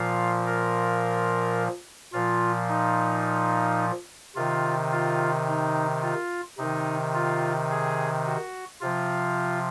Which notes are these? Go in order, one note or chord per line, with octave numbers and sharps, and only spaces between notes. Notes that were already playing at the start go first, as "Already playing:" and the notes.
Already playing: A#2 F3 F5
A#4
A#2 F3 F4
D#4
C3 D#3 F4
F4
D#4
F4
C3 D#3 D#4
F4
G#4
F#4
C3 F3 F4